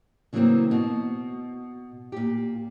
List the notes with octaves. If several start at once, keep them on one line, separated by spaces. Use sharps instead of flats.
C#3 E3 F#3 A3 A#3 C4
B2
A#2 G4